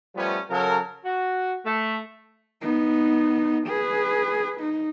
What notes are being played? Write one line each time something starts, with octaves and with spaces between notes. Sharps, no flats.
F3 G3 A3 B3 C#4
C#3 F#3 A4 A#4
F#4
A3
B3 D#4
G#4 B4
D#4